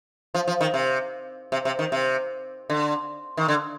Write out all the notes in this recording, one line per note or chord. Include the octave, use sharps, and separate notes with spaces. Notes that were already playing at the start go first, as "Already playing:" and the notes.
F3
F3
D#3
C3
C3
C3
D#3
C3
D3
D#3
D3